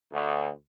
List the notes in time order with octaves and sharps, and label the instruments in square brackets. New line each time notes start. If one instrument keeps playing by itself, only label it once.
[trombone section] D2